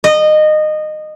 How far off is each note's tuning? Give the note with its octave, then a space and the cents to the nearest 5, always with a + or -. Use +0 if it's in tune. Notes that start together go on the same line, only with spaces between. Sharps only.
D#5 -20